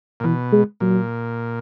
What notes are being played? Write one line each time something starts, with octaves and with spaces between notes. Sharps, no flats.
A#2
B2 E3
G#3
A#2 F#3